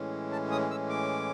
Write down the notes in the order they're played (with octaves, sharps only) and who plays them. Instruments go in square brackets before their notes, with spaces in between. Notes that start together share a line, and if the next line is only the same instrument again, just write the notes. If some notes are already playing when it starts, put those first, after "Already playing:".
Already playing: [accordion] A2 E3 G#3 C#4
A5
D#6
E6
D6